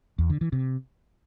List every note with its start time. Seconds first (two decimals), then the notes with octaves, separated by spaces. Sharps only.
0.18 E2
0.30 D3
0.41 E3
0.52 C3